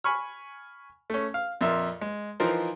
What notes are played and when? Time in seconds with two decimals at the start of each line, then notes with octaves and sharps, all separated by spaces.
0.04 G#5 B5 C#6 F6
1.10 A3 C#4
1.34 F5
1.61 F2 A#2 A#3 E5 C6
2.01 G#3
2.40 E3 F3 D#4 A#4 C5